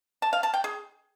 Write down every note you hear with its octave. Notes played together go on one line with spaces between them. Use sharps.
A5
F5
A5
G5
G#4